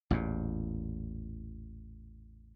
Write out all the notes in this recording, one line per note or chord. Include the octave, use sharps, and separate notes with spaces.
A1 E2 A#2